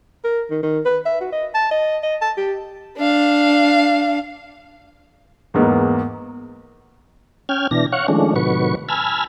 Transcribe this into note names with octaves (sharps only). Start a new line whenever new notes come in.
A#4
D#3
D#3
B4
E5
F#4
D#5
A5
D#5
D#5
A5
G4
D4 F5
E2 G#2 A#3 B3
C#4 G5 F6 G#6
B2 E3 D4 A#6
C#5 F5 F#5 C#6
D#3 F3 G#3 A3 C#4 D4
A2 C3 D#3 F#3 B4 C#6
G#5 A5 B5 E6 F6 G#6